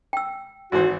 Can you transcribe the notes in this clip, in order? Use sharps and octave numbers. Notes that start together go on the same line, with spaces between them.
G5 E6
G#1 E3 F#4 C5